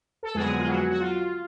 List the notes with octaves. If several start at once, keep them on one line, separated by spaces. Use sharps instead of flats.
A4
F2 D3 F#3 G#3 B3 G#4
F4
F#3 F#4
F#4
F4